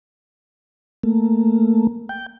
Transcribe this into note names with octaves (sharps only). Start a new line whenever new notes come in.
A3 A#3
G5